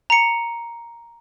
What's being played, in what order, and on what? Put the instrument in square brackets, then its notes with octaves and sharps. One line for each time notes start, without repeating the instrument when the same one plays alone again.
[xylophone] A#5 C#7